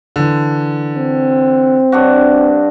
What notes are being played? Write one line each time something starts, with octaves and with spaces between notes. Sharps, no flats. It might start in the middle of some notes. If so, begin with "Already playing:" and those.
D3 E3
C4
G2 D4 F#4